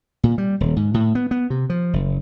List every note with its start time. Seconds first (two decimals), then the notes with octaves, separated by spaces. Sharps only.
0.23 A#2
0.38 G3
0.60 D#1
0.76 G#2
0.94 A2
1.15 B3
1.31 B3
1.50 C3
1.70 F3
1.93 F#1